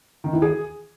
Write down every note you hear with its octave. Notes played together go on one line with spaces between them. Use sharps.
D#3
E3
G#4